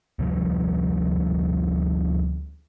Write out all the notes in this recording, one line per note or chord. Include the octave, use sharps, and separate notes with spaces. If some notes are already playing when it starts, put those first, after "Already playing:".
D2 C3 F3 G3